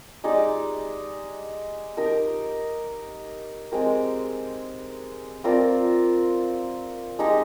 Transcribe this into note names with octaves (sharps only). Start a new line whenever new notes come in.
G#3 D#4 G4 D5
D#4 G4 A#4
G#3 C4 G4 A#4
C4 F4 A#4 D5
G#3 D#4 G4